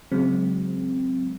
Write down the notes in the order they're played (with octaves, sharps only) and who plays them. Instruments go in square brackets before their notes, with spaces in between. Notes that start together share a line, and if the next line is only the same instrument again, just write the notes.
[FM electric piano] C#3 F#3 G#3 C4